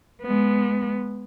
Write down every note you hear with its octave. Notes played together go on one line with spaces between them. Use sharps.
G#3 B3